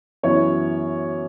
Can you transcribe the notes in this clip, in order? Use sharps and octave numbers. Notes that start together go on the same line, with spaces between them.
F#2 E3 B3 C#5